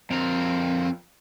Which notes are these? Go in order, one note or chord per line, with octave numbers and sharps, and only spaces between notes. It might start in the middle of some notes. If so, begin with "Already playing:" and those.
F2 C4 A#4